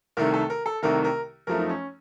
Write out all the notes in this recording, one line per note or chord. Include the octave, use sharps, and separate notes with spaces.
C2 C3 D#3 A3 A#4
A4
A#4
A4
C2 C3 D#3 A3 A#4
A#4
F#2 F3 A3 A#4
D#4
C#4